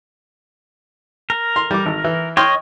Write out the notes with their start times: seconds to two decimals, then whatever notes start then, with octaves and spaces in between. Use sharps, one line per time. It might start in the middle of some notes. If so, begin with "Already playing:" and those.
1.30 A#4
1.56 C6
1.71 G3 D6
1.86 G#1
2.04 E3
2.37 C#5 D#5 G5 C6 F6